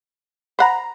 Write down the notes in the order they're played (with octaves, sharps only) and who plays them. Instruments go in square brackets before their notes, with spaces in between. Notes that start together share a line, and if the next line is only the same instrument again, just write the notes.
[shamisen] C5 F#5 [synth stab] A#5 B5